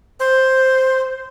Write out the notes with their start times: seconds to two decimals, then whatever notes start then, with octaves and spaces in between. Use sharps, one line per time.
0.20 C5